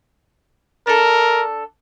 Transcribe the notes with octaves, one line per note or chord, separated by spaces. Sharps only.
D4 A4 A#4